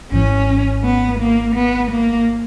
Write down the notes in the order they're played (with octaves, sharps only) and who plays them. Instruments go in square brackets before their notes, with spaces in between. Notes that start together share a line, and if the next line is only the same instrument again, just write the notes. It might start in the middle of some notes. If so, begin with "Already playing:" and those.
[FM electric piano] G#1 G#2 E3 [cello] C#4
[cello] B3
A#3
B3
A#3